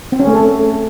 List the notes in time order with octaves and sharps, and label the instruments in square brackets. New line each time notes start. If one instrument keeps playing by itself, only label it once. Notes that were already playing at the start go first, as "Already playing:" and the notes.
[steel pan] C4
C#4
A3
A4